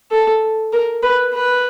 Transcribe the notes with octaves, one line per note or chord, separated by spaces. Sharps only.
A4
A#4
B4
B4